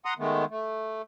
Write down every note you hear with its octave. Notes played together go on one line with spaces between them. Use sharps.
F#5 A#5 C6 D#6
D#3 G#3 A3 B3
A3